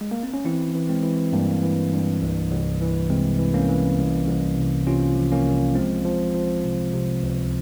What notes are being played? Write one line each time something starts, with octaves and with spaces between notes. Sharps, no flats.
G#3
A#3
C4
C#4
E3 C4 E4
E3
G#3 C4
E3
G2 G3 A#3
E3
G2
C2
C2
E3
C3 G#3 C4
E3
A#3 C#4
E3
C2
C2
C3
C3 C#4 F4
F3
A#3 C#4
C2
F3 G#3 C4
F3
F3
C3
C3
C#2